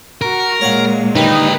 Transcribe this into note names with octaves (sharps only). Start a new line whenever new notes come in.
F#4 A#4
A#2 G#3 C#5 F5 F#5
D#2 D3 G3 D#4 B4